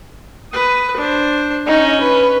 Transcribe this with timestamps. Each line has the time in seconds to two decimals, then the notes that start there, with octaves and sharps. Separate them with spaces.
0.53 B4 D#6
0.96 D4 C5
1.67 C#4 D#4
2.02 B4